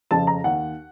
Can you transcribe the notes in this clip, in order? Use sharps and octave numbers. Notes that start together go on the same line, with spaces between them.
F2 C#3 F3 A5
A#5
D#2 F#5